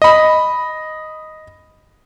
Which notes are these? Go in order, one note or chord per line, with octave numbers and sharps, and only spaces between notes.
D#5 B5